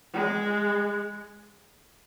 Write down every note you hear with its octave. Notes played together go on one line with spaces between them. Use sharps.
G#3